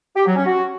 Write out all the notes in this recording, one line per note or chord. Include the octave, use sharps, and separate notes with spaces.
G4
F#3
C#4
F#4